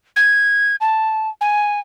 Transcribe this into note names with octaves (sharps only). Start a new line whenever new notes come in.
G#6
A5
G#5